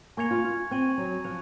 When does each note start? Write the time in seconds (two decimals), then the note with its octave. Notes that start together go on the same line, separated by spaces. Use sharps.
0.17 A#3 G#5 C#6 G#6 C#7 F7
0.31 F4
0.44 F4
0.71 C4 C#6 G#6 D#7 F#7
0.98 F#3
1.24 F3 C#6 F#6 C#7 F7